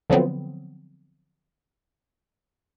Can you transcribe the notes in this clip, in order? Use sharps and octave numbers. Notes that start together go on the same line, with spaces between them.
D3 F3 F#3 B3 C4